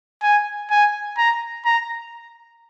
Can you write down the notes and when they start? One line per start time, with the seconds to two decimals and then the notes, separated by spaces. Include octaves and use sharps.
0.23 G#5
0.71 G#5
1.18 A#5
1.65 A#5